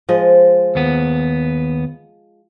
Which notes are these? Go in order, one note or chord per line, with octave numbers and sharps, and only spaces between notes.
F3 G#3 D#5
D#2 B3